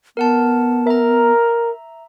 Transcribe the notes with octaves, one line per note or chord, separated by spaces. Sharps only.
B3 A#4 F#5 A5
A#4 E5 A#5